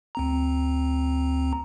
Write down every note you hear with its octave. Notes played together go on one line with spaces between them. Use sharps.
D2 C4 A#5